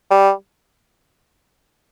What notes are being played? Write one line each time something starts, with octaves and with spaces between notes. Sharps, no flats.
G3